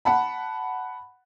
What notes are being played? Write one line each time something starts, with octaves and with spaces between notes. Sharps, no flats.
F#5 A5 B5